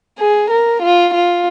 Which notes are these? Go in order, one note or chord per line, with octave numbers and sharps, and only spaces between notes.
G#4
A#4
F4
F4